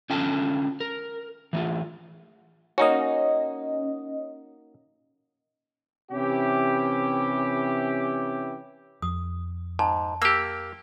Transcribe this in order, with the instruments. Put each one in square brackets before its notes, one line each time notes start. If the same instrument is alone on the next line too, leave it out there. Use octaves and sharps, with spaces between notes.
[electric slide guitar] D3 C#4 F4 G5 A5
A#4
E3 A3 F4
[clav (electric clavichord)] A#3 D#4 F#4 [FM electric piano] C#4 D#5
[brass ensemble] C3 E3 C#4 E4 G4
[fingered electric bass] F2 [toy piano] D#6
[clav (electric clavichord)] G#2 [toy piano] A5
[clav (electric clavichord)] A#3 G4 [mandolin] E6